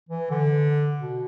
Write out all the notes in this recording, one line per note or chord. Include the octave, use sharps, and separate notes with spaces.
E3
D3
B2